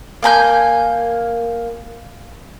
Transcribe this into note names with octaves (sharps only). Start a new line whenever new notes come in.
A#3 G#5 A#5 G6